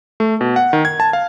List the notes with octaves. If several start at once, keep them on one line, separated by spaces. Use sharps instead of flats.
A3
B2
F#5
D#3
G#6
A5
F5